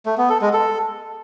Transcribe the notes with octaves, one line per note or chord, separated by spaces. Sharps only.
A3
B3
A4
G#3
A4